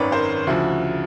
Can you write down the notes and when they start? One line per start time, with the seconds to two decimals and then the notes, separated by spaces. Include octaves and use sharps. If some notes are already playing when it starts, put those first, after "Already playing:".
Already playing: G#1 F#2 D#3 B4 C#5 D5
0.12 A#4 C5
0.47 D2 C#3 F3 E4 F#4